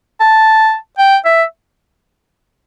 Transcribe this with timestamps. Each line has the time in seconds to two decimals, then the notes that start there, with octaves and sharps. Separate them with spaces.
0.20 A5
0.98 G5
1.25 E5